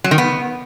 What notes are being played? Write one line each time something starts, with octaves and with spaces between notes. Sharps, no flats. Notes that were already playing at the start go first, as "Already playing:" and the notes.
F#3
D#3
B3